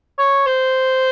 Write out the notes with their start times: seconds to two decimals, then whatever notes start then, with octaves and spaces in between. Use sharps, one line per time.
0.18 C#5
0.47 C5